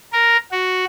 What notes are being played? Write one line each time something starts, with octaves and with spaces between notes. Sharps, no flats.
A#4
F#4